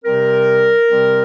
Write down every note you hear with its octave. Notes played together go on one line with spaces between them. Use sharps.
C3 G3 C4 A#4
C3 G3 C4